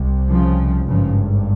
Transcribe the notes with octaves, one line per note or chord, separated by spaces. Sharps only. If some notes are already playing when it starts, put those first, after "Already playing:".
Already playing: C2 C3
C#3 F3
G#1 G2 C#3 F3